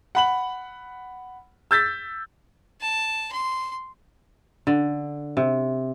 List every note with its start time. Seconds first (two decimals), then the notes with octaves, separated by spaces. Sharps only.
0.15 F#5 B5 F#7
1.71 E6 G6 A6 B6
2.81 A5
3.33 C6
4.67 D3
5.37 C3